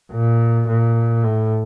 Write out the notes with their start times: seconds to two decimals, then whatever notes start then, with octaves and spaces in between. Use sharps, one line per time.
0.11 A#2
0.68 A#2
1.24 A2